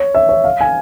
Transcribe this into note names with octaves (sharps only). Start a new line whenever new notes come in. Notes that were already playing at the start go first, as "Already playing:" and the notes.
Already playing: C#5
E5
C#5
F5
G#5